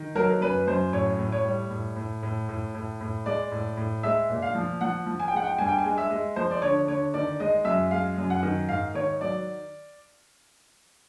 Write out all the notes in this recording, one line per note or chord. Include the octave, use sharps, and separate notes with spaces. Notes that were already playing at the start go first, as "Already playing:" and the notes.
Already playing: D#3
F#3 A#4
A#4
F#2 B4
F#2 C5
A2 C#5
A2
C#5
G3
A2
A2
A2
A2
A2
A2
G#3 D5
A2
A2
G#3 E5
A#2
F5
F3
F3 F#5
F3
G#5
G5
G#3 F#5
G5
G2 G#5
G5
G#5
G#3
E5
G#3
F3 C5
D5
D3 C#5
D3 C#5
D#3 D5
G#3 D#5
F#2 E5
G#3 F5
F#2
F#5
D#3
G#2 F5
D#3 C#5
F#3 D5